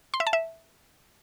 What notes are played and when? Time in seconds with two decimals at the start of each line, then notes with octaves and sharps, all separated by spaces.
0.14 C6
0.20 E5
0.27 A5
0.33 E5